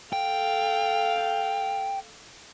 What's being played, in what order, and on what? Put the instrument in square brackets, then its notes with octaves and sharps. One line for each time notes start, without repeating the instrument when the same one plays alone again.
[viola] A4 F5 [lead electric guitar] G5